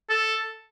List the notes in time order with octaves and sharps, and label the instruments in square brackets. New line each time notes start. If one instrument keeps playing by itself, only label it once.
[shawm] A4